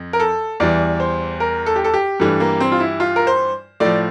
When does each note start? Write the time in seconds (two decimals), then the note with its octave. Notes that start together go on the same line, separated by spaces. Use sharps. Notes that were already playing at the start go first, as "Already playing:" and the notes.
Already playing: F2
0.13 A#4
0.20 A4
0.60 E2 E3 G3 D5
1.00 C5
1.40 A#4
1.66 A4
1.76 G4
1.84 A4
1.94 G4
2.20 G2 E3 G3 A3
2.40 A#3
2.60 C4
2.72 F4
2.80 E4
3.00 F4
3.16 A#4
3.27 C5
3.80 A2 F3 D5